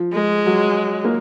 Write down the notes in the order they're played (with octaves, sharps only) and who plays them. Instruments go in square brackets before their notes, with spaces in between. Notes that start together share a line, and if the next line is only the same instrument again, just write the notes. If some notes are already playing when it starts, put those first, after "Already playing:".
Already playing: [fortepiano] F3
[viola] G#3
[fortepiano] F#3
A#3